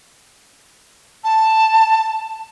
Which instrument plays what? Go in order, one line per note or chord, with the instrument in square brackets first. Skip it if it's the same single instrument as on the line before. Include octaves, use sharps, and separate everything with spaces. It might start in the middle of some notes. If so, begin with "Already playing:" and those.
[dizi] A5